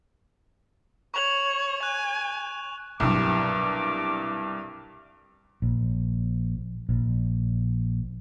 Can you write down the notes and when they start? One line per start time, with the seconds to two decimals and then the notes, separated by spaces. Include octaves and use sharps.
1.14 C#5 C#6 F7 F#7
1.83 G#5 F#6
3.00 C2 G2 B2 F#3 D6
5.62 A#1
6.89 A#1